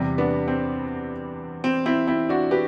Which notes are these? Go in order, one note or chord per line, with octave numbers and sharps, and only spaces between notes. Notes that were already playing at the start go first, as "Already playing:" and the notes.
Already playing: E2 C3 G3
B3 D4
C4
C4
C4 E4
C4 E4
D4 F#4
G4 B4